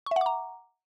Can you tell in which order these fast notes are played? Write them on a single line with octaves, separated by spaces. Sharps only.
C#6 E5 F#5 D6 A#5